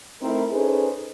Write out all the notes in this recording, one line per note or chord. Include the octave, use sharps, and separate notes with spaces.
A3 C4 D#4 E4 A#4
C#4 D#4 G#4 A4 B4 C5